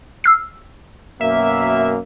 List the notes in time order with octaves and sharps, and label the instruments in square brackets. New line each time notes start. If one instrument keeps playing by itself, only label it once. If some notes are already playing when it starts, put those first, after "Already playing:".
[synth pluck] E6 F6 C7
[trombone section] F#2 B2 A#3 [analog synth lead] E5